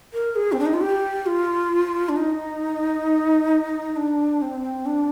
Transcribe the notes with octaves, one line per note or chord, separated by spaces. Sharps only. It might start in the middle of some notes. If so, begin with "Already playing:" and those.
A#4
G#4
C4
D4
D#4
F4
G4
F4
D4
D#4
D4
C4
D4